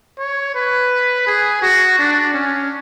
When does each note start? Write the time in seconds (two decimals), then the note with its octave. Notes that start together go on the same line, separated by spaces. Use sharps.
0.19 C#5
0.55 B4
1.27 G#4
1.62 F#4
1.99 D4
2.34 C#4